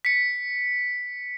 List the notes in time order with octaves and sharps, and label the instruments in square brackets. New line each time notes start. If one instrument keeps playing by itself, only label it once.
[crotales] B6 C#7